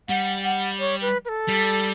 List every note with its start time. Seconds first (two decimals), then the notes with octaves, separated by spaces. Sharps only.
0.09 G3 F#5
0.44 F#5
0.79 C#5
1.01 B4
1.25 B4
1.29 A4
1.48 G3